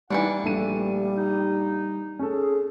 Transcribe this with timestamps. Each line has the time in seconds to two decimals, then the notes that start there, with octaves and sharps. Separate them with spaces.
0.10 E3 F#3 G3 D4 D#4 F#5
0.43 A#1 G3 A3 A4 D#7
1.15 D#4
2.19 C#4 G#4 A4